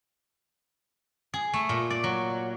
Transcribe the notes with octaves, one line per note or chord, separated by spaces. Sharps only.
G#4
A3
A#2
D5
F#3